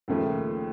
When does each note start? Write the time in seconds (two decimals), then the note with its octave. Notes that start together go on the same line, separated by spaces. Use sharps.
0.08 D#2 C#3 F3 A3